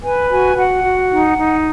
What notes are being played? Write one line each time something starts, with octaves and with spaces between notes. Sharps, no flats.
B4 G#5
F#4 G#5
F#4 F#5
F#4
D#4
D#4